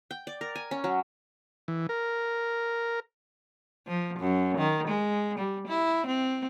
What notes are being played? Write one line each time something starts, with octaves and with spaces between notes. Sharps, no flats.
G5
D5
A#4
G#5
C#4
F#3
E3
A#4
F3
F#2
D#3
G#3
G3
E4
C4